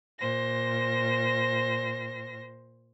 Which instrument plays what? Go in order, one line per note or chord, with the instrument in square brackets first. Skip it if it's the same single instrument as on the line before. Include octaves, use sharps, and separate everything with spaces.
[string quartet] A#2 C5 A#6